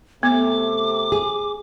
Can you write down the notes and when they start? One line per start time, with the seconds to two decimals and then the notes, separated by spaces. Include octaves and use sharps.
0.23 C3 A3 B3 D6
1.12 G#4